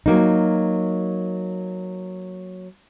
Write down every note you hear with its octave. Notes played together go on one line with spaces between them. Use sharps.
F#3 A#3 D#4